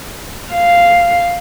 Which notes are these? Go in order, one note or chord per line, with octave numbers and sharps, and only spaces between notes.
F5